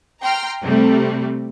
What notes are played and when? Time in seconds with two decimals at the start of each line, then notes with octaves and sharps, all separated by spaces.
0.24 G5 A#5 C6 F6
0.62 C3 G3 A3